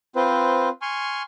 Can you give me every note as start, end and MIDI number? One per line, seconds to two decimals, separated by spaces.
0.16 0.69 60
0.16 0.69 65
0.16 0.69 71
0.16 0.69 72
0.82 1.22 80
0.82 1.22 84
0.82 1.22 85
0.82 1.22 89